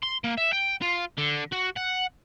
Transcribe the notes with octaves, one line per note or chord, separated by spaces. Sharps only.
C6
A#3
E5
G5
F4
D3
F#4
F#5